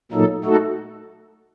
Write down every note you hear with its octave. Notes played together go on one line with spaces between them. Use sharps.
A#2 F#3 A#3 D#4 A4
A3 D#4 F#4 A4